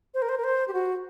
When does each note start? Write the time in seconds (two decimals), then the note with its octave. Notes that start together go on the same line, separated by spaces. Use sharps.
0.14 C5
0.22 A#4
0.29 C5
0.38 A#4
0.44 C5
0.68 G4
0.73 F#4